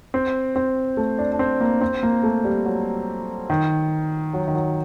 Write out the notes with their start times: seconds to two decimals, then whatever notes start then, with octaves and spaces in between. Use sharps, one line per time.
0.14 C4
0.56 C4
0.97 A3
1.19 D4
1.32 D4
1.39 C4
1.61 A#3
1.81 C4
2.03 A#3
2.23 A3
2.44 G3
2.65 F#3
3.50 D#3
4.33 F#3
4.48 D#3
4.55 F#3